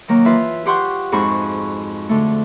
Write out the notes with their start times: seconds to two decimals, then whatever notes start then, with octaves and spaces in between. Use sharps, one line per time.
0.08 D#3 F#3 A#3
0.25 E3 F4 B4 E5
0.65 F4 G4 F#5 C6 C#6 F#6
1.12 F2 G#2 F#4 B5 C#6
2.09 D3 A3